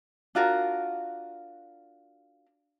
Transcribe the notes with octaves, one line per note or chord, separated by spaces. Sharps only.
D4 F4 F#4 A#4